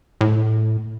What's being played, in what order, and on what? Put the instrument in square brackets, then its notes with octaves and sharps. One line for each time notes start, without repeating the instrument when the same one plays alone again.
[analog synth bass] A2